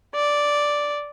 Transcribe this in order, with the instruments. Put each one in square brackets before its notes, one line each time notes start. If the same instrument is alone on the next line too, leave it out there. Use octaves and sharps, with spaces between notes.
[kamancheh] D5